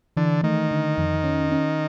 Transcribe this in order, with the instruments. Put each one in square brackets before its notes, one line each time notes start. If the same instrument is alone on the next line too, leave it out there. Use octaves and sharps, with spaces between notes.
[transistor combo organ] D3 [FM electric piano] E3
[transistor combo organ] D#3 [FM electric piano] A3
[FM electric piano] D3
F2
C#4
C#4